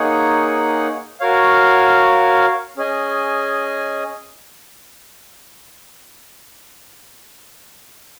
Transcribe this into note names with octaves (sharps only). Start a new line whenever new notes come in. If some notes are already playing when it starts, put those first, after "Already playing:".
Already playing: A#3 D#4 G#4 C#5 F#5
F#4 A#4 C#5 F5
C#4 G#4 D#5 G#5